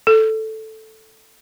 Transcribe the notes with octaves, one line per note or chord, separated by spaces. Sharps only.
A4